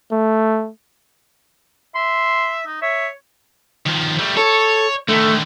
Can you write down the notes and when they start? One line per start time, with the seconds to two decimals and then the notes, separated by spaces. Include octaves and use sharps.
0.12 A3
1.95 E5 C6
2.66 D#4
2.82 C#5 E5
3.86 D#3 F3
4.19 G3 A3
4.37 A4 C#5
5.09 D3 D#3 A3